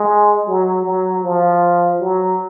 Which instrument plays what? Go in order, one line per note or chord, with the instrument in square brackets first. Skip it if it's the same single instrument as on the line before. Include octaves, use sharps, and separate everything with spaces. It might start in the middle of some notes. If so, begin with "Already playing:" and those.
Already playing: [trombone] G#3
F#3
F#3
F3
F#3